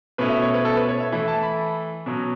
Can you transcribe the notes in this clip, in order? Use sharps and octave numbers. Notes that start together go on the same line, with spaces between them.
B2 A3 C#4 E4 B4
E5
C#5
B4
A4
B4
C#5
E5
E3 A3 E4
A5
B5
B2 F#3 C#4